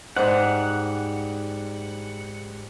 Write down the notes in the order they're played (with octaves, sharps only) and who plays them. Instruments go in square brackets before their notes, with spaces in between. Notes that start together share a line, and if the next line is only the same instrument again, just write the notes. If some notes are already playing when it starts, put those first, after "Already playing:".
[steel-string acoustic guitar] G#2 G3 [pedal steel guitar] F#5